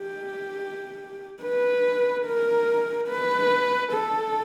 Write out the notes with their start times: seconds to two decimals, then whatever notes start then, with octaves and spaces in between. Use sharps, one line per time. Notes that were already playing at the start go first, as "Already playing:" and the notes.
Already playing: G4
1.42 B4
2.26 A#4
3.09 B4
3.93 A4